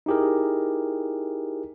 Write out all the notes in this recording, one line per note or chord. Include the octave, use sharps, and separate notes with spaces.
D#4 E4 G4 G#4 A#4